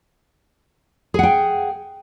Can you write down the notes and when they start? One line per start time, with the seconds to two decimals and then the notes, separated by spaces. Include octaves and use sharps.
1.14 G#4
1.19 F#5
1.23 G5